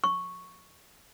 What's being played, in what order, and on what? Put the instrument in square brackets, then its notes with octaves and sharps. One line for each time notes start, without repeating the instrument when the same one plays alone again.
[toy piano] C#6